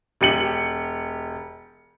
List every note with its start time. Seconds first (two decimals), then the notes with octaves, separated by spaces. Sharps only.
0.21 E1 G4 C#7 F#7